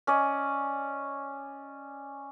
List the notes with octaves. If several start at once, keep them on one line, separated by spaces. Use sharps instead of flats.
C#4 D5 D#5